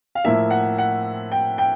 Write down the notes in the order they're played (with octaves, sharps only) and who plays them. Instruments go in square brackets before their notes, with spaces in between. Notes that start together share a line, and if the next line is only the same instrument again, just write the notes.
[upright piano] F5
A2 F3 A#3 E5
F#5
F#5
G5
G5